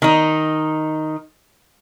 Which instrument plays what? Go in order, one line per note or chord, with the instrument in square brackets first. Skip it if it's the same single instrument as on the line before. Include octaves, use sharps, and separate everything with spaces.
[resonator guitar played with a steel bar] D#3 D#4